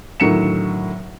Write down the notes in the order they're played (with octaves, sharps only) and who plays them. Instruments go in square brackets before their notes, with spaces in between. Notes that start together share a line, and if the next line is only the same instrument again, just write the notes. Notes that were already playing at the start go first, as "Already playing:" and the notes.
[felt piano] A2 D3 D#3 F#3 C#7 E7